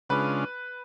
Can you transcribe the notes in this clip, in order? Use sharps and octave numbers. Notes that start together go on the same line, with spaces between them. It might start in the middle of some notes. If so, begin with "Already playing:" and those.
C#3 G#3 D4 F4 B4